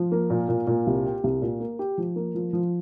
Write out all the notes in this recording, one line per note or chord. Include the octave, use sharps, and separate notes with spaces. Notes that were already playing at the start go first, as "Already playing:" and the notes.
Already playing: F3
A#3
A#2
A#2
A#2
C2
G4
C2
A#2
A#3
G4
F3
A#3
F3
F3